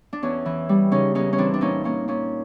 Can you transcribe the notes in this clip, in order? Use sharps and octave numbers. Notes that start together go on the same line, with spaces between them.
D4
E2 C#4
E3
G3
C#3 C#4 D#4
E2 C#4 D#4
C#4
E3 C4 D4
D4
A#2 C#4 D#4
A#3 C#4
A#2 C#4